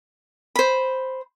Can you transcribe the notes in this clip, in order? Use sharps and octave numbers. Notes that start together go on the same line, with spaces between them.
C5 B5